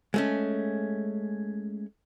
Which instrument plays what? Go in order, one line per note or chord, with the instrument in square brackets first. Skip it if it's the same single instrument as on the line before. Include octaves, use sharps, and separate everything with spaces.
[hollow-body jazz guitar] G#3 A3 C#4